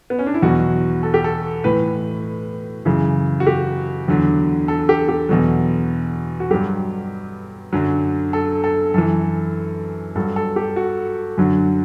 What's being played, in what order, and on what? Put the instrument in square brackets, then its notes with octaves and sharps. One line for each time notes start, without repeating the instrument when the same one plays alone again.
[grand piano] B3
C#4
D4
E4
E2 B2 F#3 F#4
A4
G4
A4
A2 E3 B4
F#2 C#3 E3
F#4
G4
E2 D3 F#3
A4
G4
G4
E2 B2 F#3
F#4
G2 F#3 G4
F#2 D3 F#3
A4
A4
F#2 E3 A4
G2 F#3 A4
A4
G4
F#4
F#2 D3 F#3